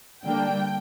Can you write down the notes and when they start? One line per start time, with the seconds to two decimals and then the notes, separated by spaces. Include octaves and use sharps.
0.24 D3 G3 A#3 D4 G5